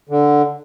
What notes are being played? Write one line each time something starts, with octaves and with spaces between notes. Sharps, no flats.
D3